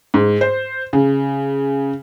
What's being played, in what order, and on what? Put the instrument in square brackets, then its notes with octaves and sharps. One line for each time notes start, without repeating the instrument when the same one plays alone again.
[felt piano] G#2
C5
C#3